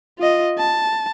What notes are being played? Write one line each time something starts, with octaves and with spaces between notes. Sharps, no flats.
F4 D#5
A5